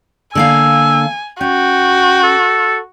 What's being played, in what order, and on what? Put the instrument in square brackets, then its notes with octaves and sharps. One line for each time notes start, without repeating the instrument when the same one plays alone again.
[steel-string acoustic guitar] D3 A#3 F5 [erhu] G#5 [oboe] E6
[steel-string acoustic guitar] C#4 [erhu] F#4 [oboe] G5
[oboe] A4